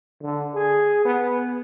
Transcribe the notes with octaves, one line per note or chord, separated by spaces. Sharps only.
D3
G#4
B3